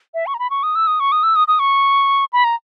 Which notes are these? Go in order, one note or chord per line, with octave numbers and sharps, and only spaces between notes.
E5
C#6
A#5
B5
C#6
D#6
E6
D#6
C#6
D#6
E6
D#6
D#6
C#6
B5
A#5